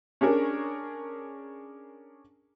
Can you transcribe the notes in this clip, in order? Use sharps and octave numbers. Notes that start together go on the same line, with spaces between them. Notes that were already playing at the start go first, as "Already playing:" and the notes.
C#4 D4 G#4 A#4 C#6